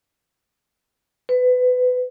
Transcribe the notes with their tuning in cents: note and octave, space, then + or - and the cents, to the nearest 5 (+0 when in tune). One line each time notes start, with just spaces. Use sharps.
B4 +25